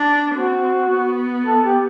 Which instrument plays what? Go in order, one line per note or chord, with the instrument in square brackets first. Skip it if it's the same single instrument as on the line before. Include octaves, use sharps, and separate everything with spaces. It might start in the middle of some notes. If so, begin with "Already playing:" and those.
Already playing: [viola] D4
[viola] C4 [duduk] F#4
[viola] B3
[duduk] A4
G4